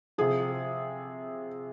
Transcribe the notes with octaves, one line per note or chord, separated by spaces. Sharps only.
C3 F3 G#4